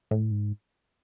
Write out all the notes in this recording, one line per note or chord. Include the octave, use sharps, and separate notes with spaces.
A2
G#2